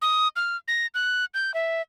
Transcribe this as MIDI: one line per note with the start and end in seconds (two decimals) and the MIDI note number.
0.02 0.28 87
0.36 0.56 89
0.68 0.87 94
0.94 1.25 90
1.34 1.54 91
1.54 1.82 76